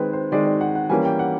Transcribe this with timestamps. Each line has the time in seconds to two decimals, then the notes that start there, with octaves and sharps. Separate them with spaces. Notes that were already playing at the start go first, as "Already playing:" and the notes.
Already playing: D#3 G#3 C4 B4
0.13 C5
0.32 D#3 G#3 C4 D5
0.46 D5
0.61 F#5
0.75 F#5
0.90 E3 G3 A#3 C#4 G#5
1.05 G5
1.19 F#5